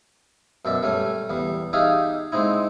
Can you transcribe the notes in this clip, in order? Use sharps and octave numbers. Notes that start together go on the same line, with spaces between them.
F#2 B2 D5 E5
G3 A3 C#4
E2 G3
D#4 G4 G#4 E5 F5
G#3 C4 D#4 E4